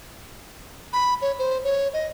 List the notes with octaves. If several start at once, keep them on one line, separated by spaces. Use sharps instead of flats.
B5
C#5
C5
C#5
D#5